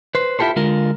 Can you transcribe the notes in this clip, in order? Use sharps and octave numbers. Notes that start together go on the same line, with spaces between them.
B4 C5
E4 F4 G4 A4 C5
D3 G#3 F4 A#4